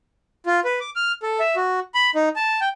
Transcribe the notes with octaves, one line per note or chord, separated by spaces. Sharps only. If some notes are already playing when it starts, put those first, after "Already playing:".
F4
B4
D6
F6
A4
E5
F#4
B5
D#4
A5
G5